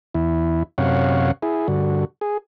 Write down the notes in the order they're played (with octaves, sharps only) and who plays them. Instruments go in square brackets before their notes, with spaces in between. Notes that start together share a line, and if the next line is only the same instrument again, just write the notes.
[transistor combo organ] E2 E4
F#2 C3 C#5 F5 F#5
E4 G#4
G2 D3 F#4
G#4